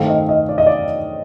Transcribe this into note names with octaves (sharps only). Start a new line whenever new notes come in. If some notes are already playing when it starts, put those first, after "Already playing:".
Already playing: G2 D#3 A3 C4 F5
D#5
D#5
D5
D#5
D5